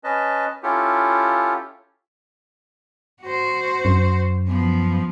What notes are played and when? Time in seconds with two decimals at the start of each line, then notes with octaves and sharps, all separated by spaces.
0.04 C#4 B4 D#5 A5
0.63 C#4 E4 F4 G4 A4
3.23 F#4 C5
3.85 F#2
4.48 F3 B3